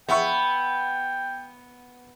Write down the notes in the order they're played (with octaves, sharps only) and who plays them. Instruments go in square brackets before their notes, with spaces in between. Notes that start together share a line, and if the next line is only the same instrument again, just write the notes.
[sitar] B3 [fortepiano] E5 F#5 C#6 [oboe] G5